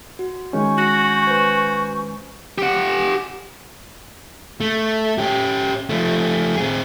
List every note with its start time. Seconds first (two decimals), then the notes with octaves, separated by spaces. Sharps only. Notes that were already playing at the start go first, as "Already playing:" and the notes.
0.19 F#4
0.53 D#3 G#3 C#4 G#5 C#6 G6
0.78 F#4 F#6 A#6 C#7
1.27 B4 C5
2.58 G4 F#5
4.61 A3
5.18 C#4 G4
5.89 F3 A3
6.57 C4 G#4